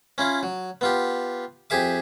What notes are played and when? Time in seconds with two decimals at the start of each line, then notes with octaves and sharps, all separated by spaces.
0.18 C#4 E4 F4
0.43 F#3
0.81 B3 F4 G4
1.70 F2 G4 G#4 E5 D6